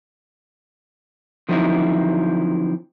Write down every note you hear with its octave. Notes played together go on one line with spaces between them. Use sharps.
D3 F3 F#3 C4 D#4 E4